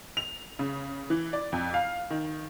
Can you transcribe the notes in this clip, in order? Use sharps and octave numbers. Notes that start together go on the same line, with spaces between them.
F7
C#3
E3
D5
F2
F5
D#3